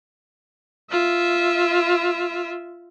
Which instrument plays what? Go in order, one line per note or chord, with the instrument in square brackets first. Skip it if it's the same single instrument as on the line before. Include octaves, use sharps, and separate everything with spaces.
[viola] F4 E5